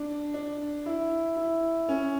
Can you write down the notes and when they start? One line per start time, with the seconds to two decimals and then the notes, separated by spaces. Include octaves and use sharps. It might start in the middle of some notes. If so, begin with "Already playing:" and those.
Already playing: D4
0.34 D4
0.86 E4
1.37 E4
1.89 C#4